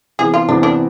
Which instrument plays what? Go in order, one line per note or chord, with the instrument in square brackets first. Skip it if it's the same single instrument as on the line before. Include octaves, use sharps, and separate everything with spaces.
[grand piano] C3 E3 B3 [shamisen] G#4
[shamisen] F4
[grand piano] C3 E3 B3 [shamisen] D4
[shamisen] D4